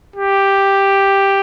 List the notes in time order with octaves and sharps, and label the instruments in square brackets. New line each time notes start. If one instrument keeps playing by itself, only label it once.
[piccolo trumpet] G4